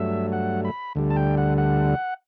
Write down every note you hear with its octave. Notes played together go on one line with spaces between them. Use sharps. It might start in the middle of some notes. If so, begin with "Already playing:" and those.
Already playing: G2 F#3 A3 E5
F#5
B5
D2 D3 G3
A5
G5
F#5
F#5